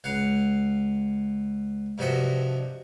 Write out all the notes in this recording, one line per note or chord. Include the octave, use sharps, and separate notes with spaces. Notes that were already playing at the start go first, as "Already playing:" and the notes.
C#2 F5 F#5
G2 C3 F3 F#4 D#5 E5